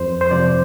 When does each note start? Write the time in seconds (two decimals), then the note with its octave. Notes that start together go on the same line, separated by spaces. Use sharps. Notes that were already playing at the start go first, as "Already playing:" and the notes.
Already playing: F2 C5
0.21 C5
0.31 C3 F3 D5